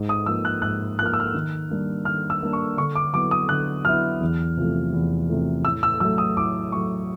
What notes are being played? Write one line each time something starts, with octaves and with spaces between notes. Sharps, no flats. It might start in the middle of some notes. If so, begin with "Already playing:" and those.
Already playing: G#2
D#6
F3 A#3 E6
F#6
G#2 F#6
F3 A#3 F6 F#6
E6
F6
D#3
G3 A#3 D4
D#3 F6
E6
G3 A#3 D4
C#6
D3 C#6
D6
F#3 B3 E4 D6
D#6
D3 F#6
F#3 B3 E4 F6
E2
C3 F3 A3
E2
C3 F3 A3
A2 E6
E6
F#3 A3 E6
D#6
A2 D6
F#3 A3 C#6